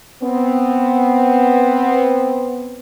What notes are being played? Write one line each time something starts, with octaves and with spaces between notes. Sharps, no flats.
B3 C4